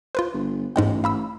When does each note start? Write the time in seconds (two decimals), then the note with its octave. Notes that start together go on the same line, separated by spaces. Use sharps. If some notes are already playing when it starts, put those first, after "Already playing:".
0.15 F4 B4 C5
0.34 G1
0.76 A1 G#2 G#3 G5
1.04 F5 B5 E6